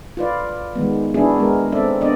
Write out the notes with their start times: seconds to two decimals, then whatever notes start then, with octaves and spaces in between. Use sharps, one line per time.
0.17 F4 B4 D5
0.75 D#3 G#3 B3
1.14 B3 D4 E4 F#4 G#4
1.36 G#3 B3 A#4
1.72 C4 A4 D5 E5
2.01 B3 D4 D5 D#5